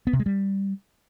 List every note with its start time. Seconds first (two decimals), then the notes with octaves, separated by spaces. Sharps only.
0.07 B3
0.13 C3
0.20 G#3
0.26 G3